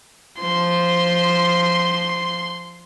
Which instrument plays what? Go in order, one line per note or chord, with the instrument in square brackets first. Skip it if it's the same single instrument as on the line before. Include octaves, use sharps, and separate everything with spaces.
[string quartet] F3 C5 [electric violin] C6